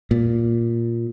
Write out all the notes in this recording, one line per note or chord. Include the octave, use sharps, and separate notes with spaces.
A#2